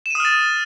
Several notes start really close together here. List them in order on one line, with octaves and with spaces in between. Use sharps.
E7 D#7 D#6 F6 A6